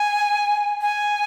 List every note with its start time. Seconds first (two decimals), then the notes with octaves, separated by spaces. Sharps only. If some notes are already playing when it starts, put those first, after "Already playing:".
Already playing: G#5
0.81 G#5